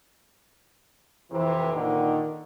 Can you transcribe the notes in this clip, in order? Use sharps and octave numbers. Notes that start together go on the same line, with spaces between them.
F2 C3 E3
A#2 D3 D#3